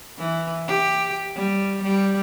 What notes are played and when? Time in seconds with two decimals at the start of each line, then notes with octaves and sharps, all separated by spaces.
0.18 E3
0.67 G4
1.36 G3
1.83 G3